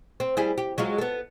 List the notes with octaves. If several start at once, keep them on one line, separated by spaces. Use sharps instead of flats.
C4
G3 E4 G#4
G4
F#3 G#3 F4
B3 A4